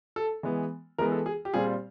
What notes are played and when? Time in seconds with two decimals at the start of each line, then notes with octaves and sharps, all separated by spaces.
0.16 A4
0.43 E3 G#3 B3
0.98 E3 G#3 B3 A#4
1.12 A4
1.26 G#4
1.45 G4
1.53 A#2 G3 C4 F4 G#4